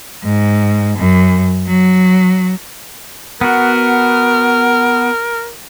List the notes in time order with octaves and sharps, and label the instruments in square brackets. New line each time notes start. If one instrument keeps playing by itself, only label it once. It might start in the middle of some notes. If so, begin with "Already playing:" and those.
[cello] G#2
F#2
F#3
[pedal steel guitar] B3 F#4 [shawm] A#4